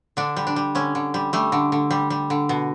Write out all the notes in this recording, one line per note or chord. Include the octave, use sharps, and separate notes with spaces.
D3 D4
G3
D4
G3
D3 C#4
D3
G3
G3 A3
D3
D3
G3
G3
D3
B2